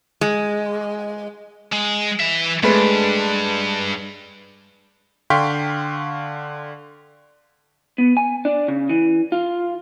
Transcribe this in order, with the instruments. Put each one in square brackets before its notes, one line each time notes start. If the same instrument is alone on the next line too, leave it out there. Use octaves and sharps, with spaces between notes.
[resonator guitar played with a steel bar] G#3
[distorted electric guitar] G#3
E3 E5
[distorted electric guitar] G2 [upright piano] G#3 A3 B4
[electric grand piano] D3 F5 G5 C6 C#6 B6
[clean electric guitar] B3
G#5
D4
C#3
E3
F4